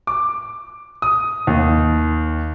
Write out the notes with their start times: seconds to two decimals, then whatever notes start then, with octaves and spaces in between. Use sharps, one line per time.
0.07 D6
1.02 D#6
1.47 D#2